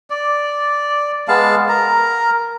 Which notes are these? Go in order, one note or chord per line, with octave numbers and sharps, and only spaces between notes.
D5
G#3 B3 F5 A5
A#4 A#5